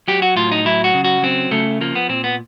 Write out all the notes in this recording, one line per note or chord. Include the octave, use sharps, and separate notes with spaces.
F#3 G4
F#4
A2 F4
D#4
F#3 E4
F#4
C#3
F#4
F#3 C4
C#3 A3
F3 A#3
B3
A#2 C4
B3